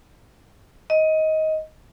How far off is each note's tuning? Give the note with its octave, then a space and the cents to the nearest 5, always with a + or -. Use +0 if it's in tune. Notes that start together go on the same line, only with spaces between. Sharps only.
D#5 +15